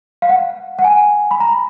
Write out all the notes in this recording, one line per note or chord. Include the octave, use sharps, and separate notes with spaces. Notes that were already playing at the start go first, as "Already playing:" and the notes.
F5
F#5
F#5
G#5
B5
A#5